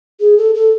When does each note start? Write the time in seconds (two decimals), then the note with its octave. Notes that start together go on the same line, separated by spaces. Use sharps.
0.20 G#4
0.38 A4
0.55 A4